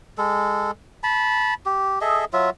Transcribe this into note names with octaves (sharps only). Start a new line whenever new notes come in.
G#3 A4
A5 B5
G4
G#4 A4 D#5 E5
F#3 F4 E5